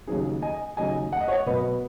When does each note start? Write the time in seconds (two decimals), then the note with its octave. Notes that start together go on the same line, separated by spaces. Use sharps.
0.07 D#2 C#3 F#3 D#4 G#4
0.42 D#5 G#5
0.77 D#2 C#3 F#3 D#4 D#5 G#5
1.12 F#5
1.21 D#5
1.28 C#5 F#5
1.46 B2 F#3 B3 B4 D#5